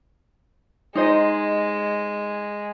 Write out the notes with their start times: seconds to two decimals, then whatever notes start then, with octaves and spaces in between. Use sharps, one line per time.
0.95 G#3 D#4 C5 D#5